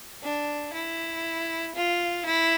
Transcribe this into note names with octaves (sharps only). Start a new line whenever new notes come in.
D4
E4
F4
E4